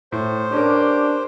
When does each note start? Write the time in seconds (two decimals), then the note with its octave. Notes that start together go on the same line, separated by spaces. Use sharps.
0.12 A2 C5
0.52 C#4 D4 G4 A#4